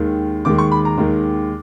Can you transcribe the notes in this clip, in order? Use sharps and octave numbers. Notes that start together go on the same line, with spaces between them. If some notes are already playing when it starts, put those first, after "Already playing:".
Already playing: D#2 D#3 G#3
D#2 D#3 G#3 D6
C#6
B5
A#5
D#2 D#3 G#3